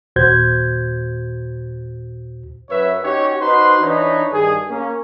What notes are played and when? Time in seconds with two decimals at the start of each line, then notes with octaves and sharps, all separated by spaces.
0.16 D#2 A#2 F#4 C5 G6 G#6
2.70 F#2 B4 C#5 E5
3.04 C#4 D#4 F#4 G4 C#5
3.41 D#4 F#4 B4 C5 C6
3.81 E3 D4 D#4 B4 C#5
4.32 G2 D#3 G#4
4.70 A#3 C#4